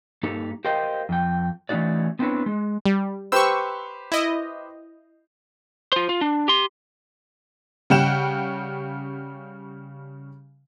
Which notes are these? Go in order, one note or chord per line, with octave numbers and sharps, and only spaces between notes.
G2 A#3 D#4 G4 A4
G4 A#4 C5 D#5 F5 G5
F2 G5
E3 A3 C#4 D#4 F#4 D5
B3 C4 D4 E4 B4 C#5
G#3
G3
G4 B4 C5 C#6 E6
E4 D#5
F4 C5
F4
D4
G4 C6
C#3 G3 F#5 G5 F#6 E7